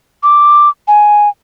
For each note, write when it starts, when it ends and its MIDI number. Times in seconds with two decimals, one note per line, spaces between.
0.23 0.69 86
0.88 1.29 80